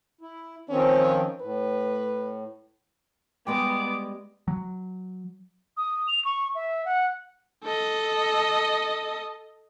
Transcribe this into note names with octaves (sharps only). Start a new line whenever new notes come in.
E4
D#3 F3 C4 C#4
A2 B4
G3 G#3 B3 G5 D6
F#3
D#6
F7
C#6
E5
F#5
A4 D#5